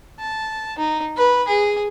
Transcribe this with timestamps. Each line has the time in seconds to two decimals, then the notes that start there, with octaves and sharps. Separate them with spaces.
0.19 A5
0.78 D#4
1.16 B4
1.47 G#4